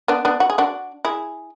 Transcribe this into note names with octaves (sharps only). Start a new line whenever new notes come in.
B3 D4
B3 D4
F#4
G#4
D4 F#4
E4 G#4